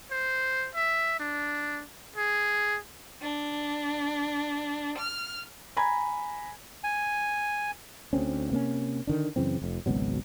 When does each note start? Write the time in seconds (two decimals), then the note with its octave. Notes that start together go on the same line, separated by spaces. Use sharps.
0.11 C5
0.75 E5
1.20 D4
2.16 G#4
3.22 D4
4.98 F6
5.77 G#5 A#5 B5 G#6
6.84 G#5
8.13 D2 G#3 C4 C#4
8.51 C3 A#3 C4 C#4
9.07 D3 D#3 D4
9.36 F#2 C#3 E3 C4
9.62 F1 F2
9.86 G#1 C#2 B2 F#3